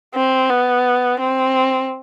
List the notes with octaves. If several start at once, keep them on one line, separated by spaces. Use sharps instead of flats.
C4
B3
C4